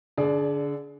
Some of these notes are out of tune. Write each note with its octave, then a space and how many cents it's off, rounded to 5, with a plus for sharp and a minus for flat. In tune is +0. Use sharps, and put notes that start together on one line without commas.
D3 -20 G#4 +25 D5 +0